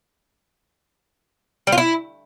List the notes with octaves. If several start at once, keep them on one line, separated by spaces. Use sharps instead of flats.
G3
F4
E4